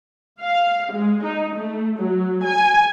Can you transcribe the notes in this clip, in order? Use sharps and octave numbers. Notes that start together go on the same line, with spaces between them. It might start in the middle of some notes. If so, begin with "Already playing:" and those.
F5
G#3
D#4
A3
F#3
G#5